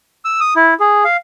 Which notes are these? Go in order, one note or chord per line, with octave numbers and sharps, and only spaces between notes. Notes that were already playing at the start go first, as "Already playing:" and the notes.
E6
D#6
E4
G#4
F5